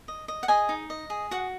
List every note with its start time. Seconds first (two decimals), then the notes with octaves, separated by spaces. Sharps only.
0.08 D#5
0.28 D#5
0.43 F#5
0.48 G#4 D#5 G#5
0.69 D#4
0.90 D#5
1.10 G#4
1.31 F#4 F#5